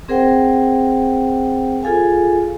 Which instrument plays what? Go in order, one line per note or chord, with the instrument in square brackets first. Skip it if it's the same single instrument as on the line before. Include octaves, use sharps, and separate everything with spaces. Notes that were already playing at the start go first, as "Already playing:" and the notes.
[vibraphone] C4 G#4 A#4 C5 F#5 G5
F4 G#4 A4 F5 G#5